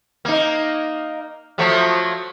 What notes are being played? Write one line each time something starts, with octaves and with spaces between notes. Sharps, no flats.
A#3 D#4
F3 F#3 A3